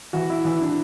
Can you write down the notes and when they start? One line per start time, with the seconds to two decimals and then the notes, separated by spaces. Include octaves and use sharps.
0.13 E3 F#4
0.30 E4
0.45 E3 E4
0.61 D4